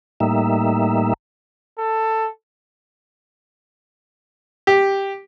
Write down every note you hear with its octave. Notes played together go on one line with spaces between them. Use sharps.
A2 G3 A#3 D#4 E5
A4
G4